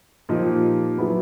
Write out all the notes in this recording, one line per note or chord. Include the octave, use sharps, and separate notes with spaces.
A#2 F3 A#3 D#4 G4
F#3 B3 E4 G#4 B4